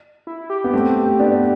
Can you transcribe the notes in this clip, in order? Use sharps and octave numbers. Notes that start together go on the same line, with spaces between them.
E4
G4
B3
A3 C4
B3 D4